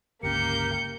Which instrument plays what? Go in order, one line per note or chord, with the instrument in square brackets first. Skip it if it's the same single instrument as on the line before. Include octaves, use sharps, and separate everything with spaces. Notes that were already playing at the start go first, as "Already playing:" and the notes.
[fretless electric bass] G1 C#2 C#4 [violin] A#3 G6 [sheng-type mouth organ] G4 A#4 [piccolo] C#7